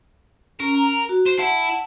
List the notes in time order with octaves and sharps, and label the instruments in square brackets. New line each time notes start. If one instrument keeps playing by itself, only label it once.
[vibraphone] C#4 [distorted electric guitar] A#4
[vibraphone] A#5
F#4
[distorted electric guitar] C5
[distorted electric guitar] E4 [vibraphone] F#5 A5